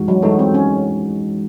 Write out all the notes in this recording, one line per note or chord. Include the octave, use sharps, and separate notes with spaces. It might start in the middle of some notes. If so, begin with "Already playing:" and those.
Already playing: E3 G#3 D#4 F#4
F#3
E3 G#3 A3 D#4 F#4
C4
C#4